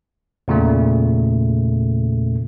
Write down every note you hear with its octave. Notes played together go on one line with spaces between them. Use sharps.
E2 A#2 C#3 A3